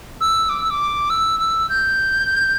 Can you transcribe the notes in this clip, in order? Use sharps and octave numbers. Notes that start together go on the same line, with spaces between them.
E6
D6
E6
D6
E6
E6
G6